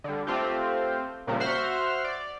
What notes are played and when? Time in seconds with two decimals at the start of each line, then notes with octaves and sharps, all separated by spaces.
0.04 D3 G3
0.27 A3 C4 F4 G4
1.27 A#2 C#3 F3 G3 A#3
1.40 F#4 C5 E5 F#5 C6 F6
2.04 D5